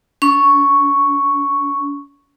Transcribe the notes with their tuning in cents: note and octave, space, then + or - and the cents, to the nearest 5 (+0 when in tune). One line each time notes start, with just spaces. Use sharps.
D4 -45 C#6 +0